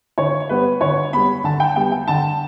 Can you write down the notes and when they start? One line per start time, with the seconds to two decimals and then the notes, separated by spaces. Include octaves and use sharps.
0.18 D3 C#5
0.49 G3 B3 B4
0.81 D3 C#5
1.13 G3 B3 B5
1.44 D3 A5
1.60 G5
1.76 G3 B3 G5
1.92 G5
2.07 D3 A5